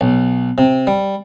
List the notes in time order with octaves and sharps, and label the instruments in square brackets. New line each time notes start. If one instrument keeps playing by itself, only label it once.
[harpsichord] B1
C3
G3